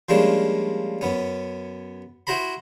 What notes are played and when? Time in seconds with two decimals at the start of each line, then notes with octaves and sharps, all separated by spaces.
0.09 F3 G3 G#3 A#3 C#4 D4
1.01 F#2 B3 C#4
2.27 E4 F#4 C5 A#5 B5